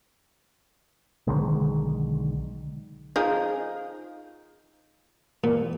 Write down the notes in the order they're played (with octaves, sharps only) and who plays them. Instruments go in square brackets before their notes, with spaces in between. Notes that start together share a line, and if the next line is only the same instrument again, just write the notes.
[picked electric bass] B1 D3 D#3 G#3
[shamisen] F3 D#4 G#4
[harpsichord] A#2